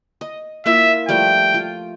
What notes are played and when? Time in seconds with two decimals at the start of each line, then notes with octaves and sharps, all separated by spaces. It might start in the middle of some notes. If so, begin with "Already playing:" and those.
0.21 D#5
0.66 A#3 E4 F4 E5
1.09 F3 G3 A3 G5
1.54 F4